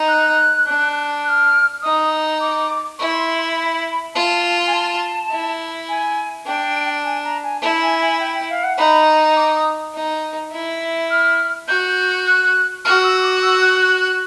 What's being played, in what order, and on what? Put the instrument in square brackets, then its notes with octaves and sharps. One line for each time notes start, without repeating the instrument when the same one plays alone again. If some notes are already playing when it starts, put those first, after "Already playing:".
Already playing: [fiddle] D#4
[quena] F#6
[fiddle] D4
[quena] F#6
F6
[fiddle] D#4 [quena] D#6
[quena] D6
[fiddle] E4 [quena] C#6
[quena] C6
C6
B5
B5
[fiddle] F4 [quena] A5
[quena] G#5
A5
[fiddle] E4
[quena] G#5
[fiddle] D4 [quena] G5
[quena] G#5
A#5
G#5
[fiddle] E4 [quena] A5
[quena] G#5
G#5
G5
G5
F5
F#5
[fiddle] D#4 [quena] B5
[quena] D6
D#6
[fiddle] D#4
E4
[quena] F6
[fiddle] F#4 [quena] G6
[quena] G6
F#6
[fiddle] F#4 [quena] F6
[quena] E6
D6
E6
F#6
F#6
F#6